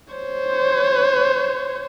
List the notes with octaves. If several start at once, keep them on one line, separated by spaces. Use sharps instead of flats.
C5 C#5